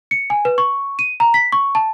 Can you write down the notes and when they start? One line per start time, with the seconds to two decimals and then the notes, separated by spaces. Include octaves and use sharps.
0.11 C#7
0.30 G#5
0.45 B4
0.58 C#6
0.99 D#7
1.20 A#5
1.34 B6
1.52 C#6
1.75 A5